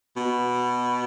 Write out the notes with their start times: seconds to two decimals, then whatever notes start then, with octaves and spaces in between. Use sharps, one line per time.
0.16 B2